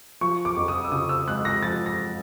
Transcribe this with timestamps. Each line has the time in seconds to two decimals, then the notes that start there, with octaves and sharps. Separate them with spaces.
0.21 F3 C#6
0.45 D6
0.57 F2
0.68 D#6
0.84 E6
0.91 C#3 D#6
1.09 E6
1.27 G#3 F#6
1.45 A#6
1.62 F3 A6
1.86 A#6